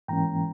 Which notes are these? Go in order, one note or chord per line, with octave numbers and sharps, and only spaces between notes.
G#2 E3 A#3 C#4 G5 A#5